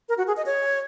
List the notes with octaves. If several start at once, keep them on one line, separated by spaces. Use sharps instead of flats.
A#4
F#4
G#4
D#5
C#5